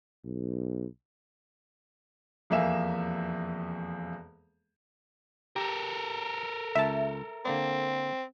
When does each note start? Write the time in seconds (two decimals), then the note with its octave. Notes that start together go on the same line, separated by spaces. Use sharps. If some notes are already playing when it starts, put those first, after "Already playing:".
0.25 B1
2.50 E1 F2 A#3 E5 G#5 E7
5.56 G4 A4 A#4
6.75 C#2 E5 A5
7.45 D3 A#3 C4 D5